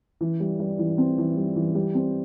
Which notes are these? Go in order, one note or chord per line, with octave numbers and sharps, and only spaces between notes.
E3
G3
G3
E3
C4
E3
G3
E3
G3
C4